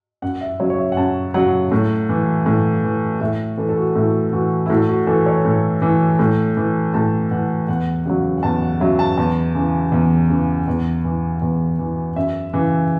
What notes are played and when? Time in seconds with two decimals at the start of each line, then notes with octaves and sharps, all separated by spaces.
0.22 F#2 F#5
0.41 E5
0.60 C#3 F#3 C#5
0.70 C#5
0.78 E5
0.92 F#5
0.97 F#2 A5
1.34 C#3 F#3 F#5
1.72 A2
2.09 E3
2.46 A2
2.84 E3
3.21 A2 E5
3.58 E3 A4
3.69 A4
3.77 F#4
3.96 A2 E4
4.33 E3 F#4
4.66 E4
4.70 A2 F#4
4.89 F#4
5.07 E3 A4
5.26 C#5
5.45 A2
5.82 E3
6.19 A2
6.57 E3
6.94 A2 A5
7.31 E3 F#5
7.68 E2 F#5
8.06 C#3 F#3 F#5
8.38 F#5
8.43 E2 A5
8.62 F#5
8.80 C#3 F#3 E5
8.99 A5
9.17 E2 A5
9.55 C#3 E3
9.92 E2
10.30 C#3 E3
10.68 E2
11.05 E3
11.42 E2
11.79 E3
12.16 F#2 E5
12.54 C#3 E3